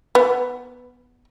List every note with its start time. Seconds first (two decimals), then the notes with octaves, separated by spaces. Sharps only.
0.15 B3